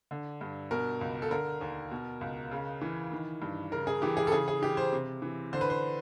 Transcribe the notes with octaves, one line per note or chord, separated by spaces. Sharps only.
D3
G2
B2 A#4
C#2
A4
D3 A#4
D#2
B2
C#2
C#3
E3
D#3
G2
C#3 A#4
G#4
E3 G4
G#4
A4
C#3 G#4
G#4
E3 G4
C5
C3
E3
D3 C5
B4
C5